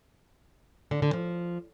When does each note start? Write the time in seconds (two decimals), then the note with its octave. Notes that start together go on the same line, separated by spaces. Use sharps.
0.91 D3
1.02 D3
1.13 F3